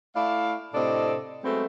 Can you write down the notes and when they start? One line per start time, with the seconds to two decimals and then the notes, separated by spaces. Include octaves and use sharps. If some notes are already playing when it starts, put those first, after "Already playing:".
0.16 A3 E4 D5 F5
0.74 A2 C3 C4 D4 A4 D#5
1.44 F#3 G#3 A3 B3 C4